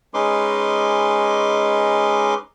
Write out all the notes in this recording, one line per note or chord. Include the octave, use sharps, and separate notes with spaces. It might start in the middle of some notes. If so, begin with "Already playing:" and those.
G#3 C#4 D#4 B4 C6 D6